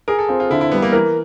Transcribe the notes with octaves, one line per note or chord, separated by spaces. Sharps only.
G#4 A#4
A4
C4 F4
F4
D3 E4
E4
G3 B3
A#3
E3 A#4